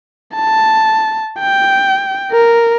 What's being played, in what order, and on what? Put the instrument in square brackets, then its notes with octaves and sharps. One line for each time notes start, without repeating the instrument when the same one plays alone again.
[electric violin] A5
G5
A#4